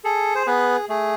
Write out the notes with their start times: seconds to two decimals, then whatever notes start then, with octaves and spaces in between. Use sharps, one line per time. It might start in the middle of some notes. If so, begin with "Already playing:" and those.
0.04 G#4 A4
0.35 C5
0.47 B3 G#4 B4
0.89 A3 G#4